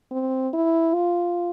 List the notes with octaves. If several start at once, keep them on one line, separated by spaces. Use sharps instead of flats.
C4
E4
F4